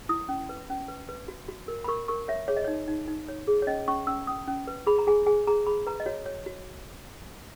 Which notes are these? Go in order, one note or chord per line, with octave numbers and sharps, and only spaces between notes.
E4 D#6
C#4
B4
C#4
B4
B4
F#4
F#4
A#4
B5
A#4 C#6
A#4 C#6
C#5 E5
G#4 C#5
D#5
D#4 C#5
D#4
D#4
C#5
G#4
C#5
C#4 D#5
C#4 C#6
C#4 E6
C#4 D#6
C#4
B4
G#4 B5
A#5
G#4 G#5
G#4 G#5
G#4 A#5
G#4 B5
B4 A#5
D#5
F#4 C#5
C#5
F#4